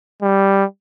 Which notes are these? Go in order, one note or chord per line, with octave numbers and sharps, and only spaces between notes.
G3